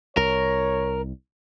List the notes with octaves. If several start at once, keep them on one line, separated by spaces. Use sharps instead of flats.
C2 A#4 C#5